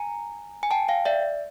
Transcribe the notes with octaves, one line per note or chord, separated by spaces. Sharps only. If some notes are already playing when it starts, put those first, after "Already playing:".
Already playing: G#5 A#5
G#5
G5 A5
F5 G5
D5 E5